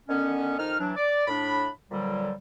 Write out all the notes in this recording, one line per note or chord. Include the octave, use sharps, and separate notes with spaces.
D3 D#3 B3 C#4
F2 D#3 D#4 F6
E3 F#3 D4
D5
A2 D4 B5
F2 A#2 D3 F#3 G3